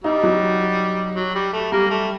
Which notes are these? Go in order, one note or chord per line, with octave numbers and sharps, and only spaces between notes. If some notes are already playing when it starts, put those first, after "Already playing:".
G3 D#4
F#3
F#3
G3
A3
G3 A#3
A3